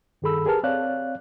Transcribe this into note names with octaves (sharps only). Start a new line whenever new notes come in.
G2 D#3 G#4 A4 B5 E6
G4 G#4 A#4 B4 A5 F6
C4 C#5 D5 F5 F#6